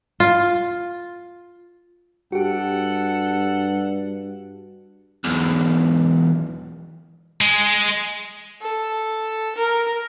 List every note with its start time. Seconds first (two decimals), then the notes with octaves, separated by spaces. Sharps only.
0.20 F4
2.32 G2 F#4 G4 A4 F#5
5.24 B1 E2
7.41 G#3
8.61 A4
9.56 A#4